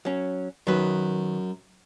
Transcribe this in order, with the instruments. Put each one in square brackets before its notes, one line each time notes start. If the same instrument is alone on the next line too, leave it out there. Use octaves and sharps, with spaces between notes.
[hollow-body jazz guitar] F#3 C#4
[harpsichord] F#2 [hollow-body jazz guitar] D#3 B4